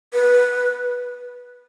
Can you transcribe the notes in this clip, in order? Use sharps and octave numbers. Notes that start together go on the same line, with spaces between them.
B4